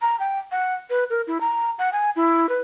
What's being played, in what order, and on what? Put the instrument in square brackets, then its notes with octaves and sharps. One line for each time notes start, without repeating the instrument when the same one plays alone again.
[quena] A#5
G5
F#5
B4
A#4
E4
A#5
F#5
G#5
E4
B4